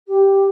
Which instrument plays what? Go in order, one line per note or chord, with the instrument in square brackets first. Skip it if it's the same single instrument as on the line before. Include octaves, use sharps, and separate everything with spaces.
[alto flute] G4